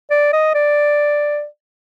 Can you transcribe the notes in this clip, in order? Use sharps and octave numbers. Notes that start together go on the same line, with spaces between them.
D5
D#5
D5